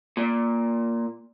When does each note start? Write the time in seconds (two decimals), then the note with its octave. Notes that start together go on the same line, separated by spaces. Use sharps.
0.17 A#2